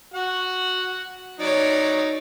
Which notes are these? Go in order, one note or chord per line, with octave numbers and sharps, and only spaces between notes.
F#4 F#5
F#3 D#4 C#5 D5